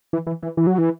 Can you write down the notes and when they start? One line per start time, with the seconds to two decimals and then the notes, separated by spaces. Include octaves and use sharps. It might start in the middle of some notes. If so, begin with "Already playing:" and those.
0.13 E3
0.27 E3
0.43 E3
0.57 E3
0.67 F#3
0.78 E3